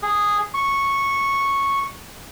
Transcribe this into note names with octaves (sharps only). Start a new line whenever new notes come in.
G#4
C#6